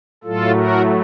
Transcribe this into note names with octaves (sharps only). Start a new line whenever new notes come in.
A2 F#3 A3 F4 A4
F#4 A#4